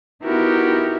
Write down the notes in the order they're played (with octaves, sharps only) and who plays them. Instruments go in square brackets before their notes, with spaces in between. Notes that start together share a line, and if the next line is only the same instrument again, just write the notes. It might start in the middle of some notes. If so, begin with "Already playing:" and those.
[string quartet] B3 D#4 E4 F#4 G4 A#4